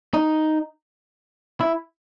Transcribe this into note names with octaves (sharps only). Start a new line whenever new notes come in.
D#4
E4